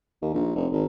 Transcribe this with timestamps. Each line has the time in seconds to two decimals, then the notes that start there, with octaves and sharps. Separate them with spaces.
0.22 D#2
0.34 A#1
0.55 F1
0.72 G#1